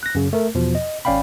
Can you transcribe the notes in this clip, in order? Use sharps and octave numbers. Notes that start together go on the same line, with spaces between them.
F#6 A#6
F#2 C#3
A3 A#4
E2 B2 F3
D#5
G#1 C#4 D5 F5 G5 B5